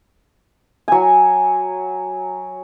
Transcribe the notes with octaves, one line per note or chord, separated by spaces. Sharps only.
F#3 G#5